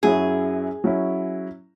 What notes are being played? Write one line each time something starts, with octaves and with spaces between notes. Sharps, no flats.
F#2 F#3 C#4 E4 G#4
F#3 C#4 E4